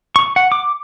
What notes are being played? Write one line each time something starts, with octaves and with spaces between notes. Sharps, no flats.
C#6
F#5
D6